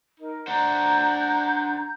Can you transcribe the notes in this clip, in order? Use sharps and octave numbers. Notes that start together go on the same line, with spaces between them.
D#4 A#4
D4 C5 F#5 A#5 G6